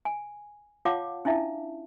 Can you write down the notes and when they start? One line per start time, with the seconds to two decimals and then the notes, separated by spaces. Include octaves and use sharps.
0.05 G#5
0.85 F4 C#5 F5 F#5 A5 D6
1.25 C#4 D4 E4 E5 F5 A5